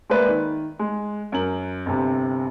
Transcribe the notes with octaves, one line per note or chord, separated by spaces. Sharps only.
G#3 A#3 B4 D5 E5
D#3
G#3
F#2 A#4 F#7
G1 C3